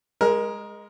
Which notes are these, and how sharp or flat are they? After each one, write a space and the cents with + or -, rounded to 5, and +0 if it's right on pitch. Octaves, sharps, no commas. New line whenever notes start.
G#3 -5 A#4 +20